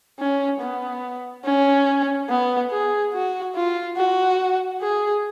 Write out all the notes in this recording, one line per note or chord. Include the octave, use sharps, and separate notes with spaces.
C#4
B3
C#4
B3
G#4
F#4
F4
F#4
G#4